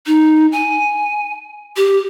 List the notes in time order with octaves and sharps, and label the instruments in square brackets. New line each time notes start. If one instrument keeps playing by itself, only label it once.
[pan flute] D#4
G#5
G4